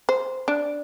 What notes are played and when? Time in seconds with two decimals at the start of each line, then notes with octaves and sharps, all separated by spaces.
0.09 C5
0.48 D4